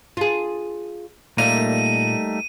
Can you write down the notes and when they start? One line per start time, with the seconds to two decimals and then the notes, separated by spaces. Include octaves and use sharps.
0.17 F4 G#4
1.38 A#2 G3 A3 A#3 D#4 F5 D#7